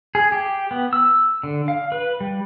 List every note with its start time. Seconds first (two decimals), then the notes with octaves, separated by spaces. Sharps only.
0.15 G#4
0.32 G4
0.71 B3
0.93 E6
1.43 D3
1.68 F5
1.92 B4
2.21 G3